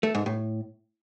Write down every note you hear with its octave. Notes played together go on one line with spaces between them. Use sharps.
A3
G#2
A2